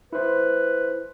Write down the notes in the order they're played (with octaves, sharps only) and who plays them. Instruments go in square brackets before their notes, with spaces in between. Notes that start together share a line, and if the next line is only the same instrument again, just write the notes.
[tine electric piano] E4 C5 [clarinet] B4